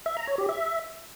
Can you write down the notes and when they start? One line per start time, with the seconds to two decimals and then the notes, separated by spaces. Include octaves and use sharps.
0.06 E5
0.17 A#5
0.27 C#5
0.38 G4
0.49 E5